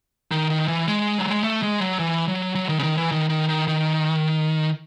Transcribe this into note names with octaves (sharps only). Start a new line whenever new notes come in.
D#3
D#3
E3
G#3
F#3
G#3
A3
G#3
F#3
E3
F#3
F#3
D#3
C#3
D#3
E3
D#3
D#3
D#3
D#3